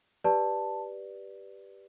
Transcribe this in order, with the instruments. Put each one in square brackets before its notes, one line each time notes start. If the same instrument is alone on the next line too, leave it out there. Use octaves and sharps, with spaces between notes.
[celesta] G4 B4 D5 A5